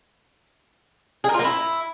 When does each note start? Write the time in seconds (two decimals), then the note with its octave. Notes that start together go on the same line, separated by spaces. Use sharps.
1.24 G#4
1.29 A#4
1.34 F4
1.39 A#3
1.44 E4